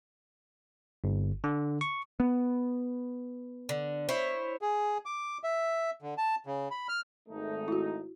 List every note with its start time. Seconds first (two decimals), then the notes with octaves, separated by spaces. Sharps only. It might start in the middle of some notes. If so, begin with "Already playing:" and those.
1.04 G1
1.44 D3
1.81 C#6
2.20 B3
3.69 D3
4.09 E4 C5 C#5
4.61 G#4
5.06 D6
5.44 E5
6.02 D3
6.18 A5
6.46 C#3
6.71 B5
6.89 F6
7.29 G#1 A3 D#4
7.68 E4 F#4